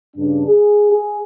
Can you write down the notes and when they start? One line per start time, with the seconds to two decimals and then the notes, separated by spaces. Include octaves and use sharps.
0.16 G2 C#3 D4
0.45 G#4
0.92 G#4